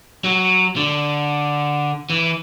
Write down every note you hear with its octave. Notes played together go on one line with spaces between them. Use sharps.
F#3
D3
E3